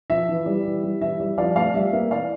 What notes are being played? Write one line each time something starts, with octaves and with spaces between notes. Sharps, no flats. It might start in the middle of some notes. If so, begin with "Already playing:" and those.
F3 E5
E3
G3
E3
G3
E3 E5
G3
F3 D5 F5
A3 D5 F5
G3 E5
A#3 E5
E3 D5 F5